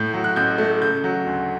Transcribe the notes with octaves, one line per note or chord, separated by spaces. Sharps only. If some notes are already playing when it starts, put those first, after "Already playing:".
Already playing: A2 G6
F#3
F#6
A1 G6
A3
C#3 G6
F#3
D2